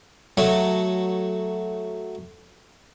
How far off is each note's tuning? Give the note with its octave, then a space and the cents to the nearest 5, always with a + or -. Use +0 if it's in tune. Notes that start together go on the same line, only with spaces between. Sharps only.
F#3 +0 A3 +0